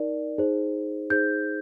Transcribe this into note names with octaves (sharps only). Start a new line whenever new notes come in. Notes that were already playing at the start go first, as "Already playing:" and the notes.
Already playing: D#4 A#4 D5
D#4 G#4 C5
D#4 G#4 C5 G6